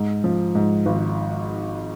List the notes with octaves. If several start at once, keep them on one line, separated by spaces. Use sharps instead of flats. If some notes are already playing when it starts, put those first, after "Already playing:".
Already playing: G#2
F3
G#2
G#1